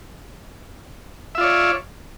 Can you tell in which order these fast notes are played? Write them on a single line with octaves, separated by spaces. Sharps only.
E5 F4 D5 C#5